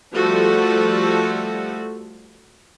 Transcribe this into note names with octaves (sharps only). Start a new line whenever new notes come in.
F3 G3 A3 F#4 A4